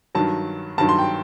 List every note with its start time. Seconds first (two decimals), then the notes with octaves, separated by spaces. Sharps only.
0.15 G2 D#3 F#3 A5
0.78 G2 D#3 F#3 A5
0.89 C6
0.98 G5